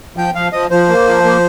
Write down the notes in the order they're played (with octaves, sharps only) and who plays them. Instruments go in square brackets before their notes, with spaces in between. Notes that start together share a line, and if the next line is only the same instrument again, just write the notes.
[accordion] F3 [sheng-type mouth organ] G5
[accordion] F3 [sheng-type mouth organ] F5
[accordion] F3 [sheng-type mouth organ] D#5
[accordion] F3 [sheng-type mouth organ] C5
[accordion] A#3
F3
A#3